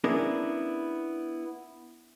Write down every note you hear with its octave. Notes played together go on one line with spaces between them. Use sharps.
B3 C#4 D4 E4 G#4 A#4